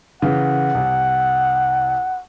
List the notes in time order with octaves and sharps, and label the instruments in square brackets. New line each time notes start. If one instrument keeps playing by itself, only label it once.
[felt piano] C#3 E3 [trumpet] F#5
[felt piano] C2